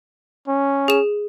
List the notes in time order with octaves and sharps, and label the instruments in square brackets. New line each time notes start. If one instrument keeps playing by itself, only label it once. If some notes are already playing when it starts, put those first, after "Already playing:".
[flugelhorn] C#4
[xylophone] G#4 E7